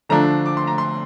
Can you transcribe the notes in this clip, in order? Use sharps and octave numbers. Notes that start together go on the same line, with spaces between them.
D3 F3 A3 D4 A#5
D6
C6
A#5
C6